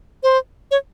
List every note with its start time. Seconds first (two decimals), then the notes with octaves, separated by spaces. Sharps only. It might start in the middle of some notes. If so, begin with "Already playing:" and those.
0.23 C5
0.71 C#5